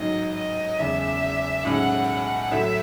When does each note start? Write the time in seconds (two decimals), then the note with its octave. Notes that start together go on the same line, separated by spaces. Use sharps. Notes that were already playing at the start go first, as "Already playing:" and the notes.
Already playing: A1 G#2 F#3 D#5
0.35 D#5
0.78 F#1 E2 C#3 G#3 E5
1.65 B1 A2 G#3 C#4 E4 F#5
2.08 F#5
2.51 A1 A2 F#3 A3 E5